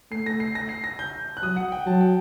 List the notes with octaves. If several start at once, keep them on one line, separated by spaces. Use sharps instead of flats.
A3 C7
A#6
C7
A#6
C7
A#6
G6
F#6
F#3 D#6
F#5
G5
F#3 A5
G5